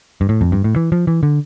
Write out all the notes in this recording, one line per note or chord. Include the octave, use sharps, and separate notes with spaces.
G2
A2
F2
G2
A2
E3
F3
E3
D3